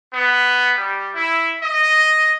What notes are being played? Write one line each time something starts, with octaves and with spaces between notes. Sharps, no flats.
B3
G3
E4
D#5